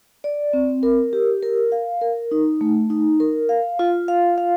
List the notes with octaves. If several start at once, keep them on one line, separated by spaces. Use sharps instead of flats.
D5
C4
A#4
G4
A#4
F5
A#4
D#4
A3
D#4
A#4
F5
F4
F5
F5